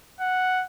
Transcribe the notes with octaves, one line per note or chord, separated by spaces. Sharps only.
F#5